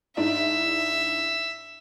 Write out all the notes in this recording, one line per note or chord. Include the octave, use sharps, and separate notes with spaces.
G#2 D4 E4 E5